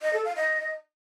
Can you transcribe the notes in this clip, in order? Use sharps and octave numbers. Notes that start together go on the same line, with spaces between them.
D#5
A4
F5
D#5